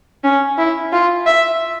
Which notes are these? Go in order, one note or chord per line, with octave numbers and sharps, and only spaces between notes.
C#4
E4
F4
E5